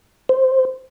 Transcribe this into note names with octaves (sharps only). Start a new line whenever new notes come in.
C5